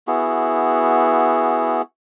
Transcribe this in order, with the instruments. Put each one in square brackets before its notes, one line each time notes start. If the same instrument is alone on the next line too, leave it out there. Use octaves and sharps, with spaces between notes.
[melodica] B3 E4 F#4 G#4